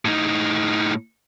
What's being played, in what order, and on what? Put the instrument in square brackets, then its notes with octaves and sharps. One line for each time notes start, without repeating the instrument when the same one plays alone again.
[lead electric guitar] A2 D#4